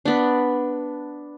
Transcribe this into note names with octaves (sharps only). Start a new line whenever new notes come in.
B3 D4